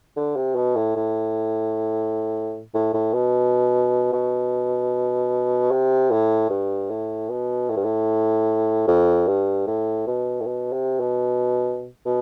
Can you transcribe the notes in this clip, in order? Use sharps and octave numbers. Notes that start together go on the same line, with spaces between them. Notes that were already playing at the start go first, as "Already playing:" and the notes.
D3
C3
B2
A2
A2
A2
A2
B2
B2
C3
A2
G2
A2
B2
A2
G2
A2
F2
G2
A2
B2
A2
B2
C3
B2
B2